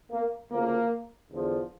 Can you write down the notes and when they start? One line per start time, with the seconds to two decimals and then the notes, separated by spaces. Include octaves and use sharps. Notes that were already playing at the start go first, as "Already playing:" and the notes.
0.11 A#3
0.51 D2 C#3 F3 A#3
1.31 E2 D3 F3